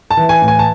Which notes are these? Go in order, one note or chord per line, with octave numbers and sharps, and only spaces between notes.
A5
E3
G#5
A2
G#5
A5